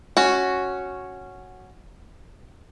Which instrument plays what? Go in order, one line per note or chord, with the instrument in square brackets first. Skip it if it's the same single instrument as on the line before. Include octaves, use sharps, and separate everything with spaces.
[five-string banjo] C#4 F#4